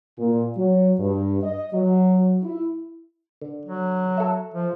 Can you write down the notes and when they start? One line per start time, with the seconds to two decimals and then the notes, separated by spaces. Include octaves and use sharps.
0.18 A#2
0.56 F#3
0.99 G2
1.43 D#5
1.73 F#3
2.43 E4
3.41 D3
3.65 F#3
4.17 A4 E5
4.54 F3